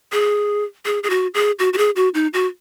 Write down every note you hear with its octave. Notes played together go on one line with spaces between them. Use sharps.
G#4
G#4
G#4
F#4
G#4
F#4
F#4
G#4
F#4
D#4
F#4